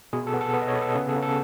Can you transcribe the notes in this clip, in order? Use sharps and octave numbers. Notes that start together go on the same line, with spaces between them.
B2 G#4
A4
B3
A4
B3
D#5
C#5
B3
A4
C#3 G#4
A4
C#3
A4